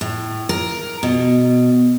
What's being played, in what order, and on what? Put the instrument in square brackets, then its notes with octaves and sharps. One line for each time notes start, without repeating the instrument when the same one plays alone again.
[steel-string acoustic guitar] A2
A#4
B2